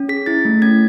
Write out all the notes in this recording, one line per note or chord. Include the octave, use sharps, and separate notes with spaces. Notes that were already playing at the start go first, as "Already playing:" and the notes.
Already playing: C#4
G#4 B6
E4 A6
A3
C#4 G#6